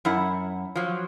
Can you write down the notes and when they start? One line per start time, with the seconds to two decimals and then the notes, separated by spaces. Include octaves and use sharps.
0.05 F#2 E4 F#5
0.75 F3 F#3